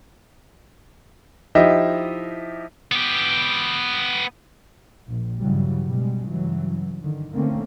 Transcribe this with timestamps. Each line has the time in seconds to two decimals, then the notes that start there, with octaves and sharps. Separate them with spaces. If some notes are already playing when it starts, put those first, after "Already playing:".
1.55 F3 D#4 E4 G4 D#5 E5
2.92 B3 G4
5.08 A#1
5.38 G2 C#3 E3 F#3 G3
5.85 B2 G3 G#3
6.24 G2 C#3 E3 F#3
7.02 D3 D#3
7.32 D3 D#3 A3 A#3 C4 C#4